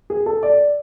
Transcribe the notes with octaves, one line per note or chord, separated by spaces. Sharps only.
G#4
A4
D5